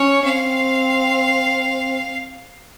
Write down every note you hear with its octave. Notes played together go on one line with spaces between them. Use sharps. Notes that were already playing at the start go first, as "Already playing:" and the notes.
Already playing: C#4 C#5
C4 F5